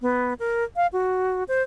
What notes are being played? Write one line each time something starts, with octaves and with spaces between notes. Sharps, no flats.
B3
A#4
F5
F#4
C5